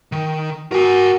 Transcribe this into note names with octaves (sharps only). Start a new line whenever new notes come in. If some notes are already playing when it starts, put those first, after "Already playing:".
D#3
F#4 A#4 G#5